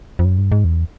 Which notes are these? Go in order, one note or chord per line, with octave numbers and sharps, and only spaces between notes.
F2
F#2
G2
G#2
E2